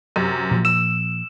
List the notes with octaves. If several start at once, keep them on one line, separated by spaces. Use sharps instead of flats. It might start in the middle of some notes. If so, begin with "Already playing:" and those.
F#2 C3
A#2 F3
E6 E7